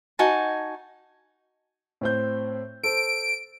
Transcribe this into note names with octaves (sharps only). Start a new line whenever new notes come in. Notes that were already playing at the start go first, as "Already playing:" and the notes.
D#4 F#4 G#5 A5
A2 C4 G6
A4 C5 D7